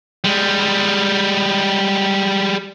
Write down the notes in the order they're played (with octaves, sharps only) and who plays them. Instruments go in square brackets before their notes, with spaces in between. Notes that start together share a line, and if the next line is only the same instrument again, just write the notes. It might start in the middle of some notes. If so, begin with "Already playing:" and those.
[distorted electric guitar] G3 G#3